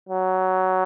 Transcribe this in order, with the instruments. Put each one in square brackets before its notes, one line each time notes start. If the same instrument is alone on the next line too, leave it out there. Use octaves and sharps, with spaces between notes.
[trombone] F#3